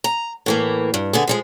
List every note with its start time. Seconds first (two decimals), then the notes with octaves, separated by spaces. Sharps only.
0.04 A#5
0.46 A2 E3 A#3
0.94 G2
1.13 D3 B3 G#4
1.27 F3 G3 G#3